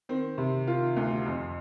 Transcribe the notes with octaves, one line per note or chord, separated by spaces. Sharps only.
D#3 C4
C3
D#3 F4
D2
F2